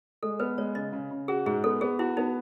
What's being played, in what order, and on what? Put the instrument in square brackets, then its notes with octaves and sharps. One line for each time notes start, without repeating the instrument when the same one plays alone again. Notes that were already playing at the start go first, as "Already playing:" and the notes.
[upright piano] G#3 [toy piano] A4
[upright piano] B3 [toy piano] B4
[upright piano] G#3 [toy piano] C#5
[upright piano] C#3 [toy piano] D#5
[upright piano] C#3
C#3
[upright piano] F#4 [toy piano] G#4
[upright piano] G#2 [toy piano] G#4
[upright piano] B3 [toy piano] A4
[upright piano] B3 [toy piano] G#4
[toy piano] E4 [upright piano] F#4
[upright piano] B3 [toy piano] D#4